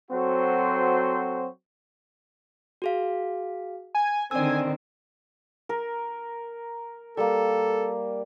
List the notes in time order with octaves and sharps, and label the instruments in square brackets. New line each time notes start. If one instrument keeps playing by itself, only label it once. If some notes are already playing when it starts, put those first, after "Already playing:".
[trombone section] F#3 C4 F#4 A4 C5
[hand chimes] F#4 G#4 F5
[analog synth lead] G#5
[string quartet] D3 D#3 C4 [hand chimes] D5 E6 [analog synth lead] G#5
[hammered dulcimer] A#4
[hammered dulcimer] G3 A#3 [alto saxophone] A4